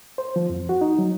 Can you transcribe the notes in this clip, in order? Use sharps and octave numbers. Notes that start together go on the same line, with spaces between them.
C5
F3
F2
F#4
D#4
F#3